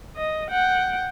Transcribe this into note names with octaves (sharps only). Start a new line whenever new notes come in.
D#5
F#5 G5